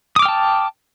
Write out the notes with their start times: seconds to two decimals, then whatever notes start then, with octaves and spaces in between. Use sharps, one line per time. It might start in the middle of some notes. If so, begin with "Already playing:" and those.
0.16 D#6
0.19 D6
0.22 F6
0.25 G5
0.28 A5